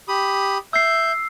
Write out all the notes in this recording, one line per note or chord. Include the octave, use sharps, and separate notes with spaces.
G4 B5 D#6
E5 E6 G6 C7